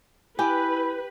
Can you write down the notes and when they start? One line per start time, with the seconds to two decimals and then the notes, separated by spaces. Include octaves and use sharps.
0.39 E4 G4 B4 G5 G#5